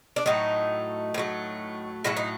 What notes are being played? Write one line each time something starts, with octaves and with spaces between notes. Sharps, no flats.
D4
A2 F#3 A3 D#4
A2 F#3 A3
A2 F#3 A3 E4
D#4